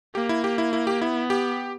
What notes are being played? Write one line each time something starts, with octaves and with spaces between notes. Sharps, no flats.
A#3 G4
E4
G4
E4
E4
G4
B3 E4
G4